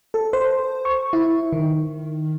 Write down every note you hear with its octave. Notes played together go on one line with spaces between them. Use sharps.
A4
C5
C#6
E4
D#3